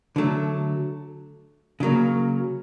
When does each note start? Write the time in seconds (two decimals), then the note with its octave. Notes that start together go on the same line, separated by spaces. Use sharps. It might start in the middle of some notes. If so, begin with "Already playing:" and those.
0.16 D3 F#3 A3
1.80 C#3 F#3 A#3